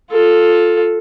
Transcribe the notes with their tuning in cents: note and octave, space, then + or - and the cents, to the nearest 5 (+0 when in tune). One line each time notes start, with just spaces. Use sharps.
F4 +15 A4 +0